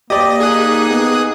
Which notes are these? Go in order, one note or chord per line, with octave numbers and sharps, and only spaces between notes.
A#3 G4 D5 D#5
D#4 G#4 D#6 F#6
B3